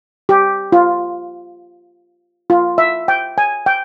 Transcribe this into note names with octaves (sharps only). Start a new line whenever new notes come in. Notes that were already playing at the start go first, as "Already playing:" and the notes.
G4
F4
F4
E5
G5
G#5
G5